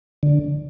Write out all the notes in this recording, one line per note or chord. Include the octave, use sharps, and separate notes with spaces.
D3